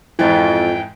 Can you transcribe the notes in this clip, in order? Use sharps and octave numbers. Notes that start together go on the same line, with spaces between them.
F2 G#2 E3 E4 G5 A6